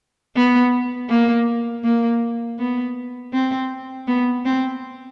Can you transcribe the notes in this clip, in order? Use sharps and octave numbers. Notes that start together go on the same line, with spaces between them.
B3
A#3
A#3
B3
C4
B3
C4